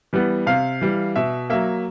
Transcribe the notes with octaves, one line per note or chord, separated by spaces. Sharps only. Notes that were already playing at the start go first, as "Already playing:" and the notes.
E3 G3 B3
C3 F5
E3 G3
B2 E5
F#3 A#3 E5